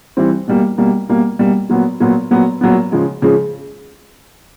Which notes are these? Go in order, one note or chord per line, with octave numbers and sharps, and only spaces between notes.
E3 G3 C4
B2 G3 A#3
B2 G3 A#3
B2 G3 A#3
B2 G3 A#3
A#2 F#3 B3
A#2 F#3 B3
A#2 F#3 B3
A#2 F#3 B3
C#3 F3 G#3
C#3 F3 G#3